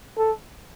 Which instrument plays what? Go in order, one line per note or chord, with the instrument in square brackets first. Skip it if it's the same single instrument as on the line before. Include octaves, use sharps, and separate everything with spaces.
[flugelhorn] A4